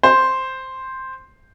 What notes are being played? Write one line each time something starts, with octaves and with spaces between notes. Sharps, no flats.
C5